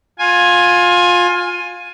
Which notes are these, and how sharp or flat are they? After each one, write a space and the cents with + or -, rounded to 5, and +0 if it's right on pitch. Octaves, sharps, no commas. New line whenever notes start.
F4 +20 G#5 +0